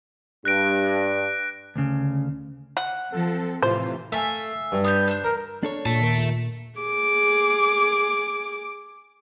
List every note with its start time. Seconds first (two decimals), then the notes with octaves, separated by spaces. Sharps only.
0.45 G2 F#6 A#6 D7
1.76 D2 C#3
2.77 F#5
3.12 F3 C4 A4
3.63 A2 C3 E3 F4 C5
4.12 A3 E5 F5 G#5
4.72 G2
4.84 B3 G4 G6
5.08 D4 C5
5.24 A#4
5.63 D4 A4 C#5
5.86 A#2 E5 A5
6.01 D#2 A#4
6.79 G#4 D6